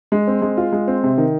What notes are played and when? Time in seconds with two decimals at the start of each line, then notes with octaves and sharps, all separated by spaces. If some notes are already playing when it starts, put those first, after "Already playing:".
0.12 G#3
0.27 C4
0.42 G#3
0.57 F4
0.73 G#3
0.88 C4
1.03 C3
1.18 D#3